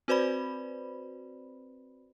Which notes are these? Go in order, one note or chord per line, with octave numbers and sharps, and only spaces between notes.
C4 F#4 B4 C5 D5 B5